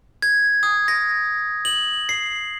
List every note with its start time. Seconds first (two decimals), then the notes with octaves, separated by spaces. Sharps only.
0.22 G#6
0.63 D#6
0.88 A#6
1.65 F#7
2.09 C7